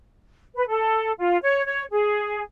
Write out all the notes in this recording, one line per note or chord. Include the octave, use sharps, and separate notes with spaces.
B4
A4
F4
C#5
C#5
G#4